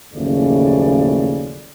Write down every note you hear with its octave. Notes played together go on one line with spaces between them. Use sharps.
F#1 D#2 A2 C#3 F3 D5